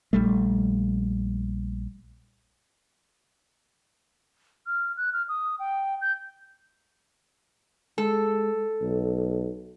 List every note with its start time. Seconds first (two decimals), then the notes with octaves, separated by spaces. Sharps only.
0.13 A#1 G3 A3
4.67 F6
4.97 F#6
5.13 F6
5.29 D#6
5.59 G5
6.01 G6
7.98 G#3 A4
8.81 B1